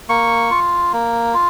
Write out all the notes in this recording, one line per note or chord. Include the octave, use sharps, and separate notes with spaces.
A#3 C#6
F4
A#3
F4